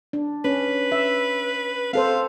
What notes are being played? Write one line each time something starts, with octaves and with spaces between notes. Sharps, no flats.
D4
C#4 B4
E5
C4 A4 C5 F5